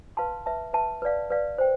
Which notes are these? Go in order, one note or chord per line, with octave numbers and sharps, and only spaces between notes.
B4 F5 A5 C6
B4 E5 A5
B4 E5 A5
B4 D5 F5
B4 D5 F5
C5 G5